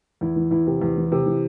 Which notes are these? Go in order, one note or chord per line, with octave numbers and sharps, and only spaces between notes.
E2 E4
E3
E2 E4
C3
E2
E3
C3
E3